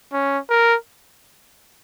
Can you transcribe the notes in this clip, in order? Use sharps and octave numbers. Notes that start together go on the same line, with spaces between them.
C#4
A#4